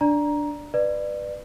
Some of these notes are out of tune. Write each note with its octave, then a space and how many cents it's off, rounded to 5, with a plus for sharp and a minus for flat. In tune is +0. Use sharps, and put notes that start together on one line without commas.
D4 +0 D5 +0 A#5 +10
B4 +0 D5 +25